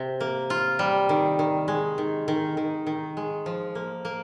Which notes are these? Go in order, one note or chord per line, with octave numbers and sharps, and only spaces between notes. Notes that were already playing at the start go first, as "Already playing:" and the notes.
Already playing: C3
A#3
F4
G3
D#3
D#3
G#3
D#3
D#3
D#3
D#3
G#3
F3
A#3
A#3